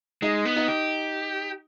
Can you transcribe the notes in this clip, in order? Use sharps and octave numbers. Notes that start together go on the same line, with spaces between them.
G#3 D#4
B3
D#4
G4